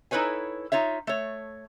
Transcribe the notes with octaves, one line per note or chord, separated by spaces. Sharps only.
D#4 E4 A4 B4 C#5 G#5
D#4 F4 C#5 E5
A3 C#5